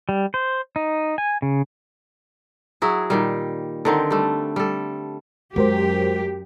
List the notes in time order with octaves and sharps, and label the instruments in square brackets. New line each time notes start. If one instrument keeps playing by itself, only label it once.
[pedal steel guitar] G3
C5
D#4
G#5
C#3
[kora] F#3 E4 F#4 G#4
A#2 D#3 G3
D3 D#3 C4
G3 A3
G3 A4
[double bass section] F#2 [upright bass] G#3 [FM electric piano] F#4 A#4 C5 [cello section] G4